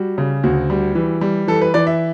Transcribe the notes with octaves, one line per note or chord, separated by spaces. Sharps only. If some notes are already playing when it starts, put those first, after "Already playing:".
Already playing: G3 F#4
C#3
D2 F#4
G3
E3
G3
E3 A4
B4
E3 D5
E5